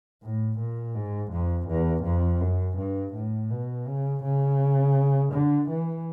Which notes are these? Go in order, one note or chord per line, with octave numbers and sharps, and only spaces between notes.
A2
A#2
G#2
F2
E2
F2
F#2
G2
A2
B2
C#3
C#3
D3
E3